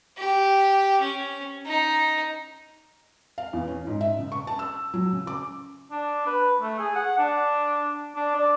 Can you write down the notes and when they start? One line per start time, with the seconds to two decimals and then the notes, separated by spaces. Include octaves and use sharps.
0.18 G4
1.02 C#4
1.66 D#4
3.38 F5
3.53 E2
3.68 C#4
3.87 G#2
4.01 E5
4.19 C#3
4.32 C#6
4.47 A5
4.59 E6
4.94 F#3
5.13 C#3
5.27 D6
5.91 D4
6.26 B4
6.60 A3
6.79 G#4
6.95 F#5
7.18 D4
8.15 D4
8.35 D5